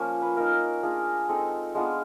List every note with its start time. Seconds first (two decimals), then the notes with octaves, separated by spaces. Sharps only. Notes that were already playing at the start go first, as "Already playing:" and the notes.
Already playing: F3 A#3 C#4
0.22 B4
0.37 A#3 D#4 A#4
0.52 A#4
0.83 A#3 D4 F4 G#4
1.29 G#3 C4 D#4 A4
1.75 G#3 B3 D4 F4